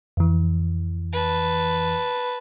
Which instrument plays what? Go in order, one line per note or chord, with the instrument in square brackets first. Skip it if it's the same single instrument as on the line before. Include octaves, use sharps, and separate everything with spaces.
[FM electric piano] F2 E3
[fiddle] B4 A5